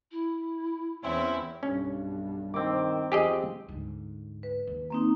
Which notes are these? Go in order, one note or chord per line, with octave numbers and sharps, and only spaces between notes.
E4
E2 C4 C#4 E4
B1 G2 C#4
D#3 C4 D6
E2 F3 G4 G#4 D#5
D2 G#2
B4
D#2
A#3 C4 D#4